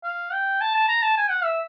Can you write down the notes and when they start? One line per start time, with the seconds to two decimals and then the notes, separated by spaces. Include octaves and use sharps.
0.04 F5
0.33 G5
0.61 A5
0.75 A5
0.88 A#5
1.02 A5
1.17 G#5
1.30 F#5
1.44 E5